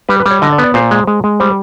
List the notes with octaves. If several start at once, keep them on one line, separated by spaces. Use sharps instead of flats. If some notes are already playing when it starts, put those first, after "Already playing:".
G3 B4
B4
G3
C#5
D3 D#5
D5
B3
D5
A#2 C5
G#3
G#3
G#3
G3 C5